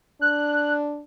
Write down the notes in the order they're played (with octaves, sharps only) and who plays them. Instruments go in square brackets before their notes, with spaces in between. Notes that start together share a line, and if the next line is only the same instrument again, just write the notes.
[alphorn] D4 [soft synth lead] F#6